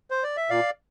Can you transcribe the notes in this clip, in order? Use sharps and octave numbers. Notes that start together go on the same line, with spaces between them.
C5
D5
E5
A#2 D5 F5